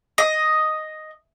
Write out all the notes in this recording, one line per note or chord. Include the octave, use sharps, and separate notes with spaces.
D#5